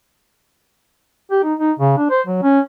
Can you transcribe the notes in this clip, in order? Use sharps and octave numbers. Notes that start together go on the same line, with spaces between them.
G4
D#4
D#4
C#3
D4
C5
F#3
C#4